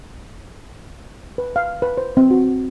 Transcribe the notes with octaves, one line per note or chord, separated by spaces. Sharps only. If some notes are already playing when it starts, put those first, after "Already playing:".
B4
F5
B4
C5
C4
F#4